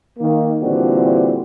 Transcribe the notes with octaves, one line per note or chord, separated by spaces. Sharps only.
D#3 A#3
A#2 D3 E3 G3 C4 F#4